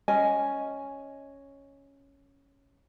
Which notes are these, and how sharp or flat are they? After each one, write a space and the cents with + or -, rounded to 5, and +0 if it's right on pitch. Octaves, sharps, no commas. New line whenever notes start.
C#4 +0 D#5 +0 G#5 +0